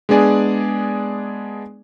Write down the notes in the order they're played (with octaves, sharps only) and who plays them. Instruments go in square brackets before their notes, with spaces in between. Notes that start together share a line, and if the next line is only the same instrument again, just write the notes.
[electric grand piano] G#3 B3 D4 G#4 D5 G#5